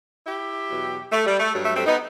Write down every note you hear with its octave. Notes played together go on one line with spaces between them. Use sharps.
E4 G4
E2 B2 F#3
A3
G3
A3
G2 F#3
A3
A3 C4
B3 D#4